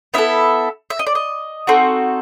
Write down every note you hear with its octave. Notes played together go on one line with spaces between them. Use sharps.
B3 E4 A4 E5
E5
D#5
D5
D#5
C4 D#4 F#4 A4